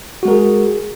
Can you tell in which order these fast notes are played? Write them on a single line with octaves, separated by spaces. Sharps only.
F#4 G#3 A#4 G#4